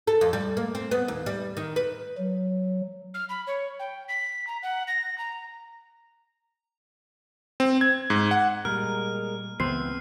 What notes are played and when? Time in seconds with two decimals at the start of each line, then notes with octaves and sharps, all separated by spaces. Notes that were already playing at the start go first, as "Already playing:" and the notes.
0.07 A4
0.21 F2
0.33 G3
0.57 A#3
0.75 C4
0.91 B3
1.08 D#2
1.26 G3
1.57 D#3
1.76 B4
2.18 F#3
3.14 F6
3.29 B5
3.47 C#5
3.79 G5
4.08 B6
4.47 A#5
4.63 F#5
4.88 A#6
5.18 A#5
7.60 C4
7.81 G#6
8.10 G#2
8.31 F#5
8.65 A#2 G3 G#3 A#4 F6
9.60 C#2 E3 B3 C4 B4 C7